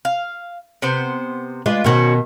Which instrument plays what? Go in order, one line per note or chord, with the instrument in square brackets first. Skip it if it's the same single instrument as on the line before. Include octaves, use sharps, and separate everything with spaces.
[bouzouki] F5
C3 B3 C5
[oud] G#3 [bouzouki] D4 F4 B4
[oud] B2 D#3 [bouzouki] C#4 F#4 C5